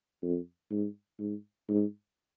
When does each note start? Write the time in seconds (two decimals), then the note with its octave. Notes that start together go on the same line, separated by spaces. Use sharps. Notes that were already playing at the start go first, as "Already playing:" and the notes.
0.22 F2
0.71 G#2
1.19 G#2
1.69 G#2